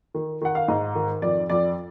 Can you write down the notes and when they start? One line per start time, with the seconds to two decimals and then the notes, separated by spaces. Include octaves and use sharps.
0.14 D#3
0.41 D#3 F#5
0.55 F5
0.68 G#2 D#5
0.95 D#3
1.22 F2 D5
1.50 F2 D5